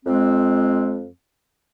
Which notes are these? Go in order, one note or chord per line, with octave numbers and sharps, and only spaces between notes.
F2 G#3 C4